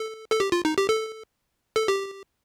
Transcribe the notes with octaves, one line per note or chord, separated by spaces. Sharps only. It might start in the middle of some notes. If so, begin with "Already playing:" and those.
Already playing: A4
A4
G4
F4
D#4
G4
A4
A4
G4